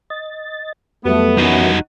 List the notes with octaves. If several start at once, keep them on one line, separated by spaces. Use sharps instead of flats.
D#5 A6
F2 F#3 G3 A3 B3
F#2 E3 D#4 F#4